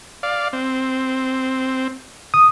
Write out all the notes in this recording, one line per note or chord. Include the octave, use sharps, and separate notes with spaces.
D5 F5
C4
D#6